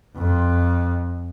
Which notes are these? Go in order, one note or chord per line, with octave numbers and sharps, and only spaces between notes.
F2